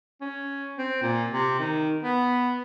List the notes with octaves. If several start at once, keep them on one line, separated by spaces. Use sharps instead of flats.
C#4
C4
A#2
C3
D#3
B3